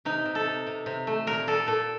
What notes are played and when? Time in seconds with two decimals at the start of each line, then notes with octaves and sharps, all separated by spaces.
0.05 C3 D#4
0.25 C3
0.35 A4
0.45 C3
0.67 C3
0.86 C3
1.07 A3
1.27 A#2 A#4
1.47 G3 A4
1.67 A#2 A4